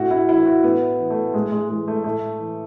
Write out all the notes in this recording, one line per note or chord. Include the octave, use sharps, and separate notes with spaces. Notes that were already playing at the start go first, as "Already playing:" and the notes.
Already playing: A2 F#4
E4
E3 E4
F#4
A2 B3
E3
A3
A2 G#3
G#3
E3 G#3
A3
A2 A3
E3